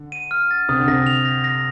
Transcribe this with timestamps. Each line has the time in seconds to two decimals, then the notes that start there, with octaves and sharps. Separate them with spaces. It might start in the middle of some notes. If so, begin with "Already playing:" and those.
Already playing: D3
0.12 D#7
0.31 F6
0.51 A6
0.69 C3 D#6
0.79 D3
0.88 C3 A#6
1.06 F7
1.25 A#6
1.44 A#6